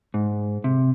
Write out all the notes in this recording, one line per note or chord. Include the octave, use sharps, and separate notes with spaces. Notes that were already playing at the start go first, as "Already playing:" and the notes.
G#2
C3